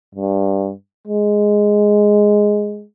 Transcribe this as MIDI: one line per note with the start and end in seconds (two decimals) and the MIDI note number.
0.15 0.71 43
1.08 2.84 56